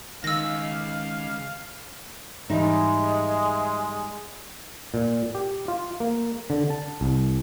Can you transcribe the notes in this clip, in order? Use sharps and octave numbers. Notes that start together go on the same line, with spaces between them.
C#2 D#3 F5 E6 A#6
G#2 E3 G3 G#3 D#4 E5
A#2
G4
F4
A#3
D3
A5
C2